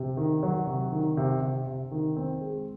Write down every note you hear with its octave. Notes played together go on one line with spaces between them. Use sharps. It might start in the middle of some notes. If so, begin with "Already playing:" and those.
Already playing: C3
D#3
F#3
C3
D#3
C3
C3
C3
D#3
C4
G#3